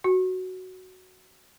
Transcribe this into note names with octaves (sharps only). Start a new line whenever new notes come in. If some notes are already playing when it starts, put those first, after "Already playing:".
F#4